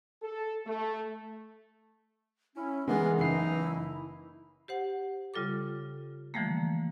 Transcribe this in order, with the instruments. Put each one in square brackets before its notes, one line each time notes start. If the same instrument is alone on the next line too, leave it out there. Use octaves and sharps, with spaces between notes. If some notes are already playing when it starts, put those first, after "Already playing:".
[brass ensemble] A4
A3
[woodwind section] C#4 [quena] E4
[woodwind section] E3 [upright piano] G#3 [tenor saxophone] B3 [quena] A#4
[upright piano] F#1 C7 [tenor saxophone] D#4 [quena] E4
[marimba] G4 C5 F#5
C#3 G3 F4 A4 D6
D3 E3 F3 G3 A3 A#3